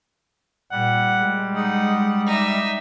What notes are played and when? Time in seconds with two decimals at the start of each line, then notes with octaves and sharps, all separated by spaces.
0.72 A#2 G3 F#5
1.20 G#3
1.56 D#4 F#5
2.27 D#4 D5 E5